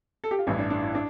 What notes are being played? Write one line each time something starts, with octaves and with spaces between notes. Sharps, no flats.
A4
G4
F4
A1 G2 E3 E4
D4
D4
E4
D4